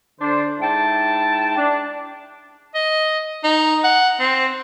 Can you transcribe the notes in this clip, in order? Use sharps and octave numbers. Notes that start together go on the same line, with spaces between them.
D3 D4 C5
G#2 E4 G5 A5
D4
D#5
D#4
F#5
C4